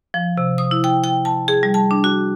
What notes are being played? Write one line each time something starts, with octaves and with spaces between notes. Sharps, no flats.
F3
C3
D#6
E4
G5
G5
A5
G#4
G3
A5
D4
F#4